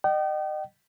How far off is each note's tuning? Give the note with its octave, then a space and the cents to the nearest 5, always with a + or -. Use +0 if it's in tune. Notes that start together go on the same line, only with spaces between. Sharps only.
D#5 -35 G5 -35